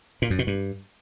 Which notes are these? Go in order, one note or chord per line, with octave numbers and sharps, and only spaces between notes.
A#2
F#2
B2
G2